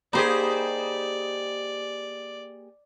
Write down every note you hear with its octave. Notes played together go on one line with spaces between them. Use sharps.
A#3 D#4 G4 G#4 C5 D5